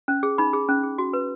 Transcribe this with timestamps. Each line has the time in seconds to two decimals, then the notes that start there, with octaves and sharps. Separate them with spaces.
0.08 C#4
0.23 G#4
0.38 D#4 B5
0.53 G#4
0.69 C#4
0.83 G#4
0.98 F#4
1.13 B4